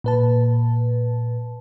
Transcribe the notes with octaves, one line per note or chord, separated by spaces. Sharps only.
A#2 B4 A5